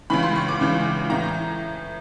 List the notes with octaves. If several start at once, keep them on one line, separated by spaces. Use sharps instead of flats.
C#2 C#3 E3 B5
C6
C#6
D6
C#2 C#3 E3
A2 E3 A#5